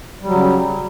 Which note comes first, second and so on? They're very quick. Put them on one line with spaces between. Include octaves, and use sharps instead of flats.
G3 F#3 C#3